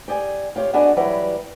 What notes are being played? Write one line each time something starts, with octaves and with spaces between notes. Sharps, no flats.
G4 G#4 D5 G#5
F4 G4 C#5
B3 D4 F#4 G#4 D5 D#5
E3 F#3 G3 G4 B4 D5